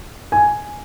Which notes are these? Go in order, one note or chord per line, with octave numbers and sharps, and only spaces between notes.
G#5